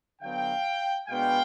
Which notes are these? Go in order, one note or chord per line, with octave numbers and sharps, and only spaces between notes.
D3 F#3 B3 F5 G5
B2 G#3 B3 D4 F5 G5